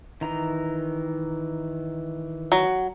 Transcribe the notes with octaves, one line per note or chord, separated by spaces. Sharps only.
D#3 E3 A#5
F#3